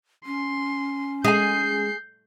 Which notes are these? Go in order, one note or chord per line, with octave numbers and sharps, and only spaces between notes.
C#4 C6
G#3 G#4 G#5 G6 C7